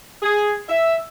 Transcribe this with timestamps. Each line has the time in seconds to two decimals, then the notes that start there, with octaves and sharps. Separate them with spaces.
0.23 G#4
0.69 E5